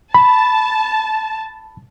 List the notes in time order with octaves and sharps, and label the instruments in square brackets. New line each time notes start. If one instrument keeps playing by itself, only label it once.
[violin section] A5 [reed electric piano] B5